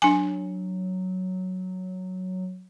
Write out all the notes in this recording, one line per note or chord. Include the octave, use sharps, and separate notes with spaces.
F#3 D4 G#5